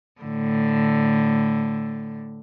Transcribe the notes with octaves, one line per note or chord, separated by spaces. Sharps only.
A2 D3